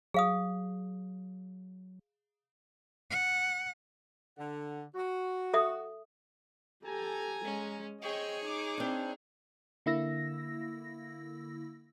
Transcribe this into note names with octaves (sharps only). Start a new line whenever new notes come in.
F#3 G#4 F5 D#6
F#5
D3 F#5
F#4
A4 E5 D#6
G4 A4 G#5 A#5
G#3 C#4
C4 G#4 C#5 D#5 G5 C#6
D#4 D6
C4 D4
D3 A#3 E4 E6 A#6